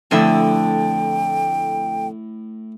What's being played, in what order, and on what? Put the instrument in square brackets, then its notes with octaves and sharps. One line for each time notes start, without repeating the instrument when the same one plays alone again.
[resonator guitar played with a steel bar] F2 D3 E5 [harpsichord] A2 [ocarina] G5